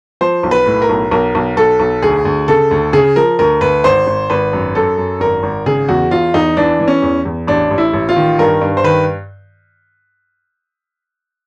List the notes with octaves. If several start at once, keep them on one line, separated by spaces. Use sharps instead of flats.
F3 C5
B1
B4
A2
A#4
B1
B1 A#4
B1
B1 A4
B1
D2 G#4
D2
C#3 A4
D2
C#3 G#4
F3 A#4
D2 A#4
D2 B4
G#1 C5
G#1
G#1 B4
F#2
F#2 A4
F#2
G#1 A#4
G#1
C#3 G#4
E2 F#4
E2 F4
E2 D#4
E3 D4
E3
C#4
E2
E2
A1 D4
A1
E4
A1
F4
D#3
G2 A#4
G2
C5
D#3 B4